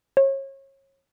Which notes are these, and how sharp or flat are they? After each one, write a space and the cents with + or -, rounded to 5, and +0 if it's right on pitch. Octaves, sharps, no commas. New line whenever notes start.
C#5 -30